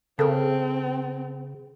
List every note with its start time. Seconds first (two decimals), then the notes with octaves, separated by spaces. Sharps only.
0.19 C#3 C4 A4 A#4